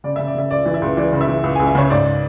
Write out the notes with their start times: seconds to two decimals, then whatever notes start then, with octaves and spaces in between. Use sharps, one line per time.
0.04 C#3 D5
0.16 E5
0.19 C#3
0.27 D5
0.35 C#3 E5
0.51 C#2 D5
0.66 E3
0.74 E5
0.82 C#2
0.97 E3 D5
1.13 C#3
1.21 E5
1.28 E3
1.44 C#2
1.56 G#5
1.59 C#2
1.67 E5
1.75 C#3 C#5
1.90 G#2 D5